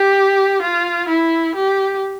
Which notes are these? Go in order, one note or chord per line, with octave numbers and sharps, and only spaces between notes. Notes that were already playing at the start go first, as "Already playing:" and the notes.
Already playing: G4
F4
E4
G4